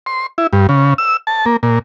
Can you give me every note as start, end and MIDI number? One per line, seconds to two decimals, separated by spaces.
0.06 0.27 84
0.38 0.47 64
0.53 0.67 43
0.69 0.94 49
0.98 1.17 88
1.27 1.45 81
1.46 1.57 58
1.63 1.79 46